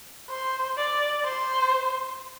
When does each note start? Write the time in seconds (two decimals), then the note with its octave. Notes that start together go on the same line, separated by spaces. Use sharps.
0.30 C5
0.77 D5
1.24 C5